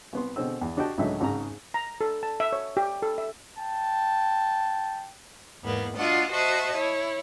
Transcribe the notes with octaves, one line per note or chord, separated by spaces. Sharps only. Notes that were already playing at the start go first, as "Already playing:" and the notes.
C2 B3 C6
B2 D3 C4 G#4 E6
E2
D4 F#4 G4 D#5 G5 A5
C#2 A2 D3 F#3 D#4 E5
G#1 G#2 C#3 A#5
A#5
A4
A5
E5
C#5
G4
A4
E5
G5 A5
E2 G#2 A#3 B3
D4 F4 F#4 D#5 F#5
F#4 C5 D#5 E5 A5
E4 C#5